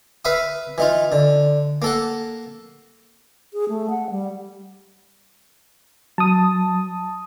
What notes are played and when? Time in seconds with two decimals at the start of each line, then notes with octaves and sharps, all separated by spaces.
0.25 B4 E5 F5 D#6
0.78 E3 D#4 F4
1.12 D3
1.82 A#3 A4 F#5
3.54 G#4
3.69 A3
3.90 F#5
4.10 G3
6.18 F#3 A5 D#6